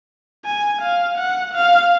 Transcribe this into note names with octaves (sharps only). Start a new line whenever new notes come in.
G#5
F5
F#5
F5